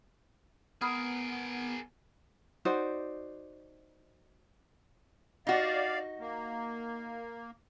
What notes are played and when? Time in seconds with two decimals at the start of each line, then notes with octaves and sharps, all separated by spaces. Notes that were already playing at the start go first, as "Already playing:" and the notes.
0.81 B3 G#4 A#4 B5 D#6 F6
2.65 D#4 F#4 C5 D5
5.47 D#4 F#4 D5 F5
6.19 A#3